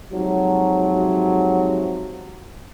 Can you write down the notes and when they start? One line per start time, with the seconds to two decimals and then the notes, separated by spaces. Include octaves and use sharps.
0.11 G#2 C3 F3 F#3